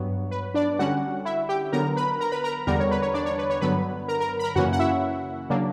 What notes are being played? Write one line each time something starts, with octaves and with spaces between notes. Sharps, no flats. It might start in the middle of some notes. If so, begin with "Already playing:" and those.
Already playing: G2 F#3 B3 C#5
B4
D4 D5
D3 G3 C#4 F#4 F#5
E4 E5
G4 G5
D3 F#3 B3 A#4 A#5
B4 B5
A#4 A#5
B4 B5
A#4 A#5
E2 D3 G3 B3 A#4 A#5
C#5
B4
C#5
D4 D5
C#5
B4
C#5
G2 D3 F#3 B3 B4 B5
A#4 A#5
A#4 A#5
B5
A#4 A#5
F#2 C#3 E3 A#3 C#4 F#4 F#5
F#5
E4 E5
C#3 F#3 A#3 D4